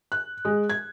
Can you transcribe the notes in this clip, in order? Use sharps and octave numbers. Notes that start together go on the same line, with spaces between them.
F#6
G#3
G#6